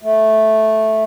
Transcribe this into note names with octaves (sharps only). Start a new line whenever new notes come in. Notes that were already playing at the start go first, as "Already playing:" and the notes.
A3